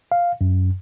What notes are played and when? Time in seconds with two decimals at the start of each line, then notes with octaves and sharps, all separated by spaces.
0.12 F5
0.41 F#2